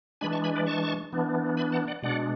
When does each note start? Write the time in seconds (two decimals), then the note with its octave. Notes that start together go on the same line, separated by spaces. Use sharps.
0.21 E3 G#3 D4 G#5 B5
0.32 A5 C#6
0.44 G#5 B5
0.55 B4 D5
0.66 A5 C#6
1.12 E3 B3 D4
1.57 G#5 B5
1.72 F#5 A5
1.87 D5 F#5
2.02 B2 G#3 D4 D5 F#5